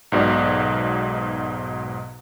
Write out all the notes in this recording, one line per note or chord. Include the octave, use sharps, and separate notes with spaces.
B1 G#2 B2 D5